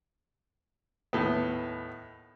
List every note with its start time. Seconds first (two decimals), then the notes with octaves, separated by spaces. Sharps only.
1.13 D#2 A2 B3